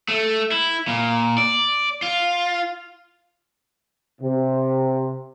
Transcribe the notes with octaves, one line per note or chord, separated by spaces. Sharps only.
A3
E4
A#2
D5
F4
C3